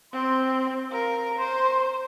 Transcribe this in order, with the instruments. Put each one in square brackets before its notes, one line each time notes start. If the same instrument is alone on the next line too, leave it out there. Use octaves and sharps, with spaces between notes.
[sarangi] C4 [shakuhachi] C6
[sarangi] A#4 [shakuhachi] F5
[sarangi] C5 [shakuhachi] C6